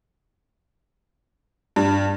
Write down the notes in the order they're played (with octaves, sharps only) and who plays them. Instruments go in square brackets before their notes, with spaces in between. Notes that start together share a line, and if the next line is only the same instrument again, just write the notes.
[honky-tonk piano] G2